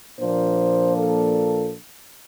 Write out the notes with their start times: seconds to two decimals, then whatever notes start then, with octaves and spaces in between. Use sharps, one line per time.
0.19 A#2 F3 A#3 D4 C5
0.98 A4